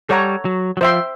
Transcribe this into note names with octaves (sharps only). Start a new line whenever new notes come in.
G3 A4 C#5 F#5 A#5 C#6
F#3
F#3
F3 C5 E5 G5 C6